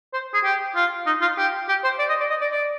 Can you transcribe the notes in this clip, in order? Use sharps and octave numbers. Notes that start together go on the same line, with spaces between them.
C5
G#4
G4
F4
D#4
F4
G4
G4
C5
D5
D#5
D5
D#5
D5
D5